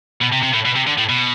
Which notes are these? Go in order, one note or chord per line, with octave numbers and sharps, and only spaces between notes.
B2
C3
C3
A2
B2
C3
D3
A2
B2